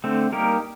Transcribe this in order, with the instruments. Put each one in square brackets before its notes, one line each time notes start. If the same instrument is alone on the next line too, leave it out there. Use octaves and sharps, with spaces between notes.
[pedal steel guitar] D3 A3 C4
G3 A#3 D#4 G4 A#4